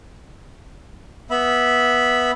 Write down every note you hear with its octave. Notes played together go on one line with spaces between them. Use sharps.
B3 E5 B5